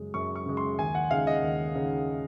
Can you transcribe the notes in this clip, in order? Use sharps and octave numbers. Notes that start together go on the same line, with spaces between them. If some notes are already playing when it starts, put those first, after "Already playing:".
Already playing: F#2 C#3 G#3
F#2 C#6
C#6
C#3 G#3
C6
D#2 G#5
F#5
C#3 G#3 D#4 F5
D#5
D#2
C#3 G#3 D#4